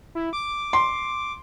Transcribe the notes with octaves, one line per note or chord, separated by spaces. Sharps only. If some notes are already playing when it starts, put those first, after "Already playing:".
E4
D6
C6